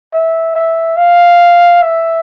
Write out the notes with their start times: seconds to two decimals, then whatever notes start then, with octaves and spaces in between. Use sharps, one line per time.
0.13 E5
0.55 E5
0.97 F5
1.82 E5